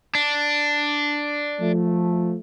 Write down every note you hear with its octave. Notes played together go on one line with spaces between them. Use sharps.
D4
F3 A3